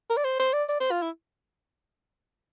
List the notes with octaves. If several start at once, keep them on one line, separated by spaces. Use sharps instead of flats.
A#4
D5
C5
C5
D5
D5
C5
F4
E4